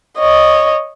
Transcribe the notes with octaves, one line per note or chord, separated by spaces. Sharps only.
C#5 D#5